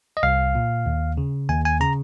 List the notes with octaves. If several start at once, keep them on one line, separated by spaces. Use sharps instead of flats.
D#5
C2 F5
A#2
D#2
C#3
D#2 G#5
G#5
C#3 A#5